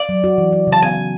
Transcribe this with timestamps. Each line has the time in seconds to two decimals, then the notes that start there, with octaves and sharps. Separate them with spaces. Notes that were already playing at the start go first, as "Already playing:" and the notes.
Already playing: D5
0.09 F#3
0.24 F#4
0.38 E3
0.52 F#4
0.67 C#3
0.72 A5
0.82 B3 G#5
0.97 E3